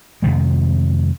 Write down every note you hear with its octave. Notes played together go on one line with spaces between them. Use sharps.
F2 C3 D#3 G#3